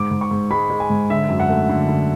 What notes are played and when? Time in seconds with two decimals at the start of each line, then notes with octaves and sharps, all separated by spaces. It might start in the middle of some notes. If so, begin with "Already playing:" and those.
Already playing: G#2 D6
0.11 G#2
0.21 C#6
0.31 G#2
0.51 G#3 B5
0.70 G#3
0.80 G#5
0.90 G#2
1.10 D3 E5
1.29 F#2
1.40 F#5
1.49 A3
1.69 D3
1.88 D3